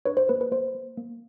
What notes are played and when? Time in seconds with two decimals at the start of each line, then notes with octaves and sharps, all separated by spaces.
0.06 D4 B4 C#5
0.17 C5
0.29 A#3 B4
0.41 B4
0.52 A#3 C5
0.75 A#3
0.97 A#3